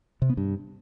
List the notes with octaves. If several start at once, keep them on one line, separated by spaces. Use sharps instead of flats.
C3
B3
G2